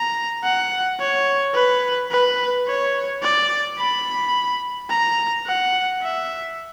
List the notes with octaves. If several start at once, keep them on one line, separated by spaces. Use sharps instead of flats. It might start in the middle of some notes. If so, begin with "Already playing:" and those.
Already playing: A#5
F#5
C#5
B4
B4
C#5
D5
B5
A#5
F#5
E5